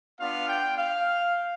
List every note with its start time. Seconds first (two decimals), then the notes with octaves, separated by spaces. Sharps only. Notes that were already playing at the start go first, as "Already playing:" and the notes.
0.20 B3 D4 F4 F5
0.49 G5
0.78 F5